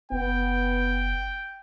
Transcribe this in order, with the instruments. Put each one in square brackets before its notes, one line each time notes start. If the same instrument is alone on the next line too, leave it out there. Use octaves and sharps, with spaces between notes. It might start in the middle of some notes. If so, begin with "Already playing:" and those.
[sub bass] F#1 [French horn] B3 [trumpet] G5